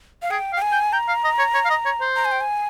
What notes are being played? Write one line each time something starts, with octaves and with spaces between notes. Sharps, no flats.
F5
G#4 G5
F5
G5
G#5
G5
G5 A#5
F5
D#5
C#5
C#5
F5
D#5
C#5
C5
A#5
G#5
G5
G#5